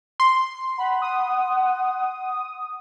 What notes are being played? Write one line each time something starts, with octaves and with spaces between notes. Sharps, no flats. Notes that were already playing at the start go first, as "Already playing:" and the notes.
C6
F#5 B5
D#6